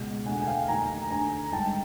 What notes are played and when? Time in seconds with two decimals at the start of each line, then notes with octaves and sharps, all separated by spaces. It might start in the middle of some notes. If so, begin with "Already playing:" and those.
Already playing: C#2 B2
0.26 E1 D2 D3 F#5 G#5
0.41 G#5
0.47 F5 G5
0.68 F1 D#2 D#3 G#5 A#5
1.10 D2 D3 G#5 A#5
1.52 G#1 G2 D3 G5 A5